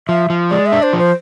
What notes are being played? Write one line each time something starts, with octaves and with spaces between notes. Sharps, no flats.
F3 E5
F3
G#3 D5
E5
D4
C5
F3
C5